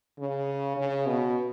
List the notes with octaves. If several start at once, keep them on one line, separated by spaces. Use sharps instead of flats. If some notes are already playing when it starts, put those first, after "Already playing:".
C#3
C#3
B2